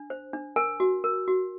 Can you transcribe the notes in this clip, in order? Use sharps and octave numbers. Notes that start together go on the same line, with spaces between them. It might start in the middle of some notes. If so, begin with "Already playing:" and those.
Already playing: D4
C5
D4
A#4 G#5
F#4
A#4
F#4